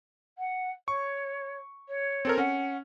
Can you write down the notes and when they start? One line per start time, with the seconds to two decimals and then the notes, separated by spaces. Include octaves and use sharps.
0.38 F#5
0.88 C#5 C#6
1.88 C#5
2.25 C4 A4 A#4
2.38 C#4 F#5